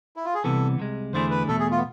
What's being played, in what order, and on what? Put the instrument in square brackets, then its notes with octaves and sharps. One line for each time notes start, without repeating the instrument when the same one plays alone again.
[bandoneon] E4
F4
G#4
[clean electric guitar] C2 C3 E3 B3 [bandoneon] A4
[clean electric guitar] C2 C3 G#3
[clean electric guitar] E2 D3 A3 E4 G#4 [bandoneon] C5
[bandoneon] B4
[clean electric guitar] E2 B2 A3 [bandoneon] A4
[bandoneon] G#4
F4
B3